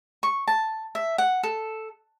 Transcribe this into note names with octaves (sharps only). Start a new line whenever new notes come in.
C#6
A5
E5
F#5
A4